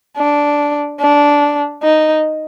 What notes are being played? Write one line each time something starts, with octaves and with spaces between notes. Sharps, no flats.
D4
D4
D#4